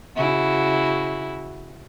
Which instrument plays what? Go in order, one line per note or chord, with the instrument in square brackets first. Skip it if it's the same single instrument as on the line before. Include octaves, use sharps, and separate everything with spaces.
[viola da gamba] C#3 E4 F#4